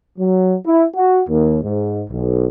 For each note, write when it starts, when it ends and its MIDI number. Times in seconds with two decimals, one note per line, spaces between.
0.18 0.55 54
0.65 0.83 64
0.95 1.20 66
1.28 1.58 39
1.63 2.03 44
2.09 2.45 35